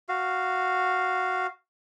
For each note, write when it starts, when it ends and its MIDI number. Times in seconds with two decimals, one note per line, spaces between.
0.09 1.47 66
0.09 1.47 77